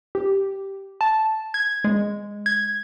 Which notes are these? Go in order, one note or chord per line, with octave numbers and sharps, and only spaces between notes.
G4
A5
G#6
G#3
G#6